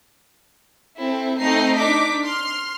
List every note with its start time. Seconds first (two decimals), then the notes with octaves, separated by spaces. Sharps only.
0.97 C4 E4 A4
1.40 A3 C4 D#4 D#5 A#5 C7
1.77 D4 D#4 D6 B6
2.23 C6 F6